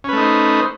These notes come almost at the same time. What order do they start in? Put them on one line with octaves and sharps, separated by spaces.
C#4 B4 A3 D#4 C5